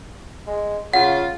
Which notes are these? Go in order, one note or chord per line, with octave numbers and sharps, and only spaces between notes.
G#3
C#3 F4 F#5